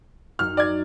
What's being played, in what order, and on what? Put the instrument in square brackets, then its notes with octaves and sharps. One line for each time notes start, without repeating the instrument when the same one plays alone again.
[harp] F#2 D#4 F#5 [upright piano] F6
[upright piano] D5 G#6